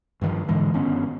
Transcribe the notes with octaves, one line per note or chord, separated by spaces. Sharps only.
G2 D#3 F3
G#2 D3 E3 G#3
G1 D#3 B3 C#4